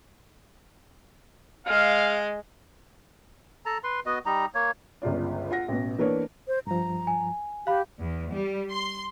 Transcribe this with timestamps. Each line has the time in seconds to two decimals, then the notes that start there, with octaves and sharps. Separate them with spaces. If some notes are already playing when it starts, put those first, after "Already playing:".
1.67 G#3 F5
3.66 A4 A5 A#5
3.84 B4 C6
4.06 B3 F#4 D#5
4.26 G3 D#4 A#5
4.54 A#3 C#5
5.02 G1 C#2 F4 D5
5.51 F4 F#5 A#6
5.68 A1 B2
5.99 E3 A#3 B3 D4 B4 C#5
6.48 C5
6.67 G2 F3 A#5
7.07 G#5
7.67 G4 F5 B5 F#6
7.99 E2
8.32 G3
8.72 C6